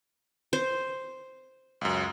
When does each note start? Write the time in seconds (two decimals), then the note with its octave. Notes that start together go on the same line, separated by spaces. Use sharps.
0.53 C5
1.81 C#2 F#2